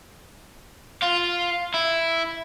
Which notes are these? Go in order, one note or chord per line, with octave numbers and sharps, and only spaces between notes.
F4
E4